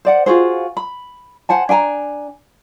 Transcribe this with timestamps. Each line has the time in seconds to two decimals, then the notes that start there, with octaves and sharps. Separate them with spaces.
0.05 C5 D5 F#5
0.26 F4 F#4 G#4 C5
0.77 B5
1.49 C5 F#5 G#5 A5
1.69 D4 G5 G#5 A#5